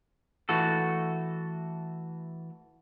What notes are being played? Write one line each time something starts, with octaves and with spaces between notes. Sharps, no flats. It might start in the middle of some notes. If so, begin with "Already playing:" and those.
E3 A3 F#4 A4